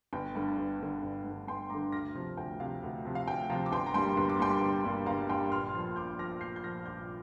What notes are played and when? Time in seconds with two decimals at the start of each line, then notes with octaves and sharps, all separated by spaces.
0.13 G1 G5
0.35 G2 D3
0.58 G1
0.80 G2 D3
1.03 G1
1.25 G2
1.30 D3
1.48 G1 G5 C6
1.70 G2 D3 A#5 D6
1.92 D2 F6 A#6
2.15 C3 F3
2.37 D2 G5
2.60 C3 F3 F5
2.83 D2
3.05 C3 F3
3.15 F5
3.27 D2 G5
3.50 C3 F3 F5 A#5
3.66 D6
3.72 G1 G5 C6
3.86 A#5
3.94 G2 G3 A#3 G5 C6
4.17 G1 C6
4.29 D6
4.39 G2 G3 A#3 G5 C6
4.61 G1
4.84 G2 G3 A#3
5.06 G1 F5 A#5
5.29 G2 G3 A#3 G5 C6
5.52 A#1 C6 F6
5.74 A#2 F3
5.96 A#1 D6 G6
6.19 A#2 F3 F6 A#6
6.41 A#1 G6 C7
6.56 G6
6.64 A#2 F3 F6 A#6
6.86 A#1 D6 G6